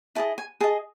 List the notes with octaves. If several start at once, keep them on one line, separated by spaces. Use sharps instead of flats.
E4 G#4 D#5 A5
G#5
G#4 D#5 A5